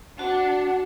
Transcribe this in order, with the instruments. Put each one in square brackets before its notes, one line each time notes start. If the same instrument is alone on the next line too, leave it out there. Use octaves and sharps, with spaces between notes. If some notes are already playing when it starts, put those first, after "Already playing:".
[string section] D4 [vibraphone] F#4 [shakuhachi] F#5